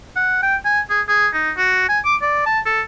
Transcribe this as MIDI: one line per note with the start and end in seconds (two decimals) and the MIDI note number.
0.16 0.38 78
0.43 0.56 79
0.65 0.80 80
0.90 1.01 68
1.08 1.28 68
1.34 1.51 63
1.57 1.85 66
1.89 1.99 80
2.05 2.16 86
2.22 2.42 74
2.46 2.60 81
2.66 2.82 69